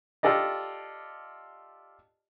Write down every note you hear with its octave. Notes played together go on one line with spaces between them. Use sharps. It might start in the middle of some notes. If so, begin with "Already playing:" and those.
F4 G4 A4 D5 D#5